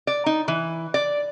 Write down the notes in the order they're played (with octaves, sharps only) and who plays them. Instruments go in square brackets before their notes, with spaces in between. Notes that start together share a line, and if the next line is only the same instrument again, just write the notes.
[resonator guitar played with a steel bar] D5
D#4
E3
D5